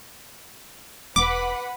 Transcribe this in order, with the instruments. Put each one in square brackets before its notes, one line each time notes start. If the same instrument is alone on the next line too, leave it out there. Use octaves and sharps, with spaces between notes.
[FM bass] E1 [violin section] B4 F#5 B5 [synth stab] D6